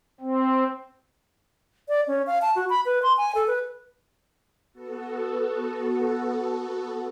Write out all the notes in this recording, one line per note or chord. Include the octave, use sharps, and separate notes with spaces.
C4
D5
C#4
F5
A5
F#4
B5
B4
C6
G#5
A4
B4
B3 F#4 A4